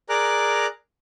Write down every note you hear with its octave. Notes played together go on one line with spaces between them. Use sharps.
G#4 A#4 D5 A#5 F#6